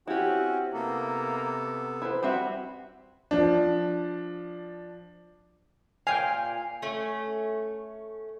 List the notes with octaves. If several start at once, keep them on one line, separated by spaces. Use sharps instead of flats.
C4 C#4 E4 F#4 G4
C3 A#3 B3 A4
E4 B4 C5
G3 C4 F#4 E5
F3 D4
A#2 F5 G5 G#5
A3 C#4